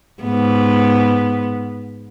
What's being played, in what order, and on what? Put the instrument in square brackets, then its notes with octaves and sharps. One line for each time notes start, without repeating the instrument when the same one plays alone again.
[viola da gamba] G#2 B3